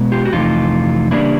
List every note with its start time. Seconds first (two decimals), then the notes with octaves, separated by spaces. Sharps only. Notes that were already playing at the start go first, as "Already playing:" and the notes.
Already playing: B2 G#3 B3
0.12 F4 G4
0.25 F#4
0.32 F2 C3 E3 A3 D#4 F4
1.11 C#3 E3 G3 A#3 D4 E4